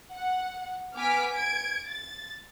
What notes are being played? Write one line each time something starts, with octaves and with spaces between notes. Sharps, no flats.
F#5
B3 G#5 D6 F6 B6 D7
G#6 D7
A6